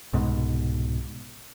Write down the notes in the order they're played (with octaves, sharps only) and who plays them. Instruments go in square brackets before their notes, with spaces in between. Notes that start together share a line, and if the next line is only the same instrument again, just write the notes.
[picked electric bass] C2 G#2 B2